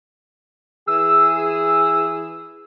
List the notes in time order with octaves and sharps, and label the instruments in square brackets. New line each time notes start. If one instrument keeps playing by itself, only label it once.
[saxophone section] E3 G#4 [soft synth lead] E6